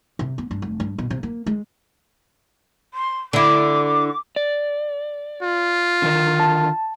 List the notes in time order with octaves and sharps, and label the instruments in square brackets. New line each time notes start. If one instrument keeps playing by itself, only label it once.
[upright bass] C3
B3
G2
F1
G2
B2
C3
A#3
G#3
[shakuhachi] C6
[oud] D3 E4 [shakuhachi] D6
[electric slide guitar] D5
[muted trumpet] F4
[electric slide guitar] D3 D#3 A#4
[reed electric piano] A5